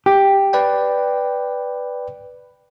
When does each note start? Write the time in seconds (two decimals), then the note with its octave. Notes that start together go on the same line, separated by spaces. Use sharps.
0.06 G4
0.53 B4 D5 G5